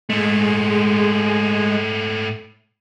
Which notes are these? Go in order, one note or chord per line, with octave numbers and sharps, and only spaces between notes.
G#2 G#3 A3